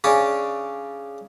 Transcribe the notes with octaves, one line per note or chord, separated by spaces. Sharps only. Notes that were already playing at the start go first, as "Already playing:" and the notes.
C#3 C#4 D4